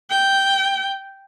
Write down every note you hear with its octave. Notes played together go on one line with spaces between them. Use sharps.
G5